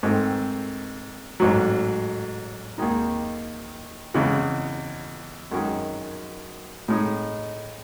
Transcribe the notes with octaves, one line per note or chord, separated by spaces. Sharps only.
G#2 D#3 A3 C4
A1 G#2 F#3
D#2 D#3 G#3 D#4
E2 C#3 E3 G#3
F#2 D#3 G#3
A2 G#3 D#4